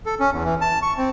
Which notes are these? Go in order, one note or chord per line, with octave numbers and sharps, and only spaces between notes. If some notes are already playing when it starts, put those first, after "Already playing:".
A4
C#4
E2
E3
A5
C#6
C4